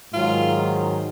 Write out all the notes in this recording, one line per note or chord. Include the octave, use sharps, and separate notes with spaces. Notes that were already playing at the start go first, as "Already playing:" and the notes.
G#2 D#3 F#3 F4